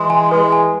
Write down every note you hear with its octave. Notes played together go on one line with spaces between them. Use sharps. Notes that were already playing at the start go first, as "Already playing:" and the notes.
Already playing: E3 G#3 C6
G#5
E3 G#3 B4
G#5